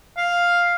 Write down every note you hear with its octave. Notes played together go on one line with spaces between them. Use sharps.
F5